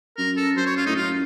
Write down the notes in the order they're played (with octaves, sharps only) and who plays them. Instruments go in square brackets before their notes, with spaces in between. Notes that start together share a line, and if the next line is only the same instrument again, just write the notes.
[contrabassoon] F#2 [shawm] A#4
[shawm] A4
[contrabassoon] F#2 [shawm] C5
[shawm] C#5
F4
[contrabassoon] A2 [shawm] D#4
[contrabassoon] F#2 [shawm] F4